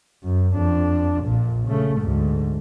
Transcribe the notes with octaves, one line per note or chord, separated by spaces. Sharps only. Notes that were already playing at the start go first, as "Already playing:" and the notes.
F#2
F2 D4
A#1 A#2
C#3 A3
D2 G#2